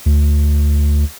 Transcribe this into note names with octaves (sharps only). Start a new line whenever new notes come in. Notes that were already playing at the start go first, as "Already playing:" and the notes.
D2